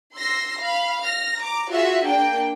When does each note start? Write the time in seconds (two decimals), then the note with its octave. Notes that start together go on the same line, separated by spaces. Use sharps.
0.16 C6 E6 A#6 C7
0.59 F5 B5
1.01 F6 A#6
1.39 A#5 D6
1.70 F4 F#4 G#4 E5
2.05 A#3 D4 G5